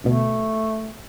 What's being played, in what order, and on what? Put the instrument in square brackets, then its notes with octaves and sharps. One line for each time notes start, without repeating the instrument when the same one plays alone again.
[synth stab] D2 B2 [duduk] A3